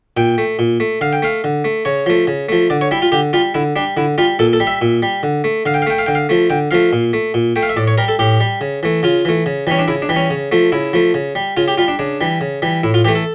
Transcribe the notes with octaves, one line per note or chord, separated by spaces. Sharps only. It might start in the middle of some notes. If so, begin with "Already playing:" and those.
A#2 G5
A3
A#2
A3
D3 F5
G5
A3 F5
D3
A3
C#3 C#5
F3 A3
C#3
F3 A3
D3 D5
C#5
G3 E4
F4
D3 G4
G3 F4
D3 E4
G3 D4
D3 E4
G3 F4
A#2 A4
A4
G3
E5
A#2
G3
D3
A3
D3 F5
G5
F5
A3 G5
F5
D3 G5
F5
F3 A3
D3 G5
F3 A3 F5
A#2
A3
A#2
A3 G5
F5
E5
A2 D5
C#5
G3 A#4
A4
A2 G4
G3
C#3
E3 A3
C#3 F4
E3 A3
C#3
E3 G3 C#4
D4
C#3 E4
D4
E3 G3
C#4
C#3
F3 A3
C#3 E4
F3 A3
C#3
G3
C#3 F4
G4
G3 F4
D4
C#3 D4
E3 G3
C#3
E3 G3
A2 E4
F4
E3 A3 G4
A4